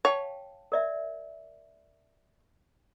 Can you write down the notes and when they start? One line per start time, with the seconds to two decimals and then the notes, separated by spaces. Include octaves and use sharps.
0.05 C#5 F5 G5 A5
0.72 A#4 D5 E5